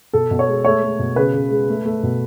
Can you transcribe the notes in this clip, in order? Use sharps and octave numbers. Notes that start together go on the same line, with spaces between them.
B2 A4
B2
C#5
G#3
A3 C#5
A3
B2
C#3 B4
C#3
G#3
A3
A3
B2